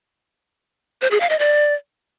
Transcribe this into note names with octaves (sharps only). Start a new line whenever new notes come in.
C5
G#4
F5
D#5
D5